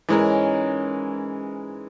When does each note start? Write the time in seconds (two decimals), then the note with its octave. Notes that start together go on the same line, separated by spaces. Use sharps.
0.09 G#2 E3 G#3 C#4 A#4